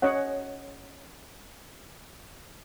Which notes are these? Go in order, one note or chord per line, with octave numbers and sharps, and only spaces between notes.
C#4 C#5 D#5 F#5